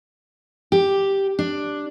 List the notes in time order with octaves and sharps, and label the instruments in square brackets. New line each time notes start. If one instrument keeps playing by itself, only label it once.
[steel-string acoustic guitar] G4
D4